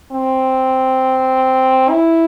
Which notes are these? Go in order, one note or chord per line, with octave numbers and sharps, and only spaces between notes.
C4
E4